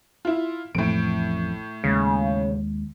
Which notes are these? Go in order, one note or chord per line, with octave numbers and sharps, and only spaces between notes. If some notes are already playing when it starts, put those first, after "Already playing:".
E4 F4
A1 F2 A2 D7
D#2 C#3 G#3